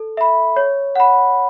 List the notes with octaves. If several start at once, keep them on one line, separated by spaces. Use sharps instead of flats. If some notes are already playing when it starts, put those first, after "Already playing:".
Already playing: A4
E5 B5
C#5
F#5 B5